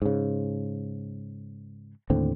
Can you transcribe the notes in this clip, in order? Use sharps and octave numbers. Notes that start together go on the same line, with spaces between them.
G#2 C#3
D#2 A2 D3 C4